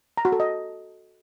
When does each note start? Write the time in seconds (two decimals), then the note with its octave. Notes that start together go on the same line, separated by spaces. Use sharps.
0.17 A#5
0.25 F#4
0.32 A4
0.40 D#5